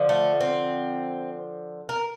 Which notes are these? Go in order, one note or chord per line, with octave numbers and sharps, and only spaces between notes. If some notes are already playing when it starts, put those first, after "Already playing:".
Already playing: D3 F3
A3
C4
A#4